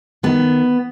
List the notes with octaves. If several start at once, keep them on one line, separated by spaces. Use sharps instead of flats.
D#3 B3